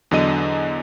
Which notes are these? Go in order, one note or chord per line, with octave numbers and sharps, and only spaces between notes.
E2 D3 F#3 D#5 D#7